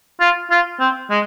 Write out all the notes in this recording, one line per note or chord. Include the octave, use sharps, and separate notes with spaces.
F4
F4
C4
G#3